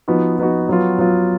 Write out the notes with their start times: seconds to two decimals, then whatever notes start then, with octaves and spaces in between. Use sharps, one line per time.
0.08 F3 B3 D#4 F#4
0.38 F3 B3 D#4 F#4
0.69 F#3 B3 F4
0.99 F#3 B3 F4